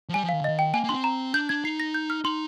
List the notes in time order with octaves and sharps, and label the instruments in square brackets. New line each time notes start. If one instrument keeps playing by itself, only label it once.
[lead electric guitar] F3
[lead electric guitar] G3 [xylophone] G#5
[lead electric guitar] F3
[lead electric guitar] D#3 [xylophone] F5
[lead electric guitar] D3
[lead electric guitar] D#3 [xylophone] D#5
[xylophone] G5
[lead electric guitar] A#3 [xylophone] G#5
[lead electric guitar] A#3
[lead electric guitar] D4 [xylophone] C6
[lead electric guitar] C4
[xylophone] A#5
[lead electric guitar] D4 [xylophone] G6
[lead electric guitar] D4 [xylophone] G#6
[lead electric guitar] D#4 [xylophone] C7
[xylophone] A#6
G6
F6
[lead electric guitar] D#4 [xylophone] C6